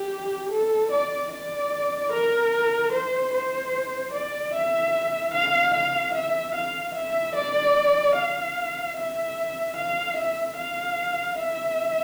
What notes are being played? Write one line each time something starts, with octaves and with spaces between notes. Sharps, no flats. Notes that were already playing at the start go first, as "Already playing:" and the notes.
Already playing: G4
A4
D5
D5
A#4
C5
C5
D5
E5
F5
F5
E5
F5
E5
D5
F5
E5
F5
E5
F5
E5